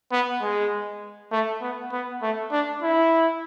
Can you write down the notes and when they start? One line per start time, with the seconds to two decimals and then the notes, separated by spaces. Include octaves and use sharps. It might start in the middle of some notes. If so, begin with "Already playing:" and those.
0.12 B3
0.42 G#3
1.31 A3
1.62 B3
1.92 B3
2.22 A3
2.52 D4
2.82 E4